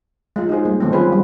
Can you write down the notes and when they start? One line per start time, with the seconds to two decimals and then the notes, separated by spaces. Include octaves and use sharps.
0.36 G#3 F4
0.49 D#4 F#4 G#4 C5
0.65 G3 G#3 A#3
0.80 D#3 F#3 A3 B3 C4
0.92 C#4 F4 G#4 B4 C5
1.09 F3 G3